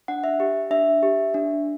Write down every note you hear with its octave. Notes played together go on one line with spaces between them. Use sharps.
D4 F#5
E5
G4
D4 E5
G4
D4